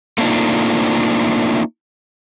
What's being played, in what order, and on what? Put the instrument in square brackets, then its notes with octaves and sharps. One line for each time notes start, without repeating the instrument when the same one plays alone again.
[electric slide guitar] A3 A#3 C4 D4 D#4 F4